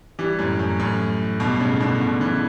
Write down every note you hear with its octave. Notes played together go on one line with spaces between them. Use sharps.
E3 G3
F#2 A2
F#2
F#2 A2
G2 B2
A2 C#3
B2 D3
B2 D3
C#3 E3